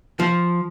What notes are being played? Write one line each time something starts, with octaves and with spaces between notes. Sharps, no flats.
F3